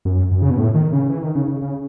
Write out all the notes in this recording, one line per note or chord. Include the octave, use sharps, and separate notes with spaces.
F#2
F#2
C#3
B2
A2
D#3
C#3
E3
D#3
C#3
C#3
C#3